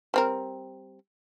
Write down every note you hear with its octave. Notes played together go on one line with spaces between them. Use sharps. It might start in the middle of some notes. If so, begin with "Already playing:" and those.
G3 C4 A#4